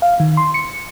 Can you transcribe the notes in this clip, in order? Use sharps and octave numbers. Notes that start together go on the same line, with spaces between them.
F5
D#3
C6
C#7